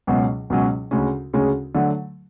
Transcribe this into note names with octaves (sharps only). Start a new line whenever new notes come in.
C#2 B2 F#3 C#4
C#2 B2 F#3 C#4
D2 C#3 G#3 C#4
D2 C#3 G#3 C#4
D3 F#3 A3